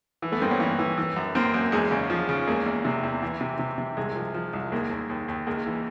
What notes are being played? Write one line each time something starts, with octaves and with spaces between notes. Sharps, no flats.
E3
A3 B3
G2 A#3 C4
B3 C#4
E3
E3
E3
F#2
F#2 A#3 C4
F#2
E2 G#3
C#3
F3
C#3
E2 G#3 A#3
E2
C3
E2
E3
C3
C3
C3
C2 G#3
F3
F3
C2
D#2 G#3 A#3
D#2
D#2
D#2
C#2 G#3 A#3
E3